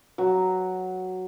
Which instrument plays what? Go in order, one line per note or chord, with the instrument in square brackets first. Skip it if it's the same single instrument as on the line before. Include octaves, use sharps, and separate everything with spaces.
[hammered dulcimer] F#3